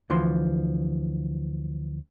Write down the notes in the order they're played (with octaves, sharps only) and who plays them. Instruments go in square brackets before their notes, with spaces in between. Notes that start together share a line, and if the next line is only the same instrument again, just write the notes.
[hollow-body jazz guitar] D2 E3 F3 C6